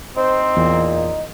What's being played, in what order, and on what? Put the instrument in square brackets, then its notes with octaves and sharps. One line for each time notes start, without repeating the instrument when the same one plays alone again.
[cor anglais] C4 [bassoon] D#4 [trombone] C5
[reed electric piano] E2 [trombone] A#2